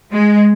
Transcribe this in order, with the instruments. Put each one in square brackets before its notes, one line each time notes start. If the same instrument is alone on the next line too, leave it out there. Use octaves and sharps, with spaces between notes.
[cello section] G#3